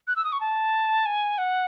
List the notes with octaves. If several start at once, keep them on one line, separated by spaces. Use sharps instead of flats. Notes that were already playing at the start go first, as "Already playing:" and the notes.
F#6
E6
D#6
C#6
A5
G#5
F#5